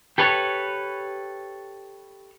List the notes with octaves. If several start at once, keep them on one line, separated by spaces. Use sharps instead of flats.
G4 A4 B4 C#5